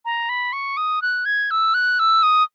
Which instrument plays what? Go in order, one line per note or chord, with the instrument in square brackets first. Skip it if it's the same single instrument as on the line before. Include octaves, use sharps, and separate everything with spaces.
[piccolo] A#5
B5
C#6
D#6
F#6
G#6
E6
F#6
E6
D#6